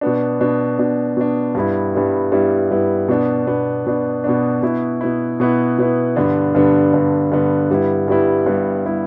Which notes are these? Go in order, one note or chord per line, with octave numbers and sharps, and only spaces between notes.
B2 B3 D4
B2 B3 D4
B2 B3 D4
B2 B3 D4
G2 G3 B3 E4
G2 G3 B3 E4
G2 G3 B3 E4
G2 G3 B3 E4
B2 B3 D4
B2 B3 D4
B2 B3 D4
B2 B3 D4
B2 B3 E4
B2 B3 E4
B2 B3 E4
B2 B3 E4
G2 D3 B3 D4
G2 D3 B3 D4
G2 D3 B3 D4
G2 D3 B3 D4
G2 G3 B3 E4
G2 G3 B3 E4
G2 G3 B3 E4
G3 B3 E4